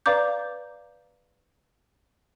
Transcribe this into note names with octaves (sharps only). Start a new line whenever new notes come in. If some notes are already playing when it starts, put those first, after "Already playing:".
B4 D5 F5 A#5 D6 G6